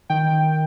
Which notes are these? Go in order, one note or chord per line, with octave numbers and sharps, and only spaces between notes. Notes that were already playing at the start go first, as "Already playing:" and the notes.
D#3 G5